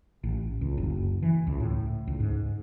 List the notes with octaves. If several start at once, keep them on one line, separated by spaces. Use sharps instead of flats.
A1
C#2
F#1
E3
C#2
A2
C#2
G#2